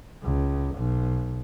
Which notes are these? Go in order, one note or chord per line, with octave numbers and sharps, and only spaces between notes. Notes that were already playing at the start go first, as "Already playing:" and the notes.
C#2
B1